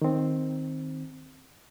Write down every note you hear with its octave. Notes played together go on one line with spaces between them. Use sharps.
D#3 C4